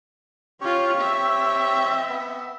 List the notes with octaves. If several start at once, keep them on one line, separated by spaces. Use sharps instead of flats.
C#4 F4 G4 C#5
C4 E5
B3